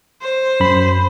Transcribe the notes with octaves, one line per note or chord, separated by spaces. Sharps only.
C5
F#2 B5